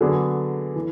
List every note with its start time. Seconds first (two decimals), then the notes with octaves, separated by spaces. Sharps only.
0.01 D3 F#3 B3 D4 G#4
0.76 E3